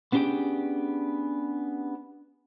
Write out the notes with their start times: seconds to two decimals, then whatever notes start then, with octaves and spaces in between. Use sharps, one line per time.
0.12 B3 C#4 D4 G4 G#4 G5